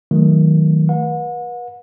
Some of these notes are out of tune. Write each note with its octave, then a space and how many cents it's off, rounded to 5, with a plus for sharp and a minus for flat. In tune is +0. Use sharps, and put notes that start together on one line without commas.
D#3 +20 F#3 +0 A3 +0
B4 -35 F#5 -40